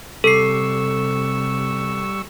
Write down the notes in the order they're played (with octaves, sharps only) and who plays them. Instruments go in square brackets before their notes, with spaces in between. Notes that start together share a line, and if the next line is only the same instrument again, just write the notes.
[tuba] C3 [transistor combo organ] G3 C#6 E6 [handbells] A4 C7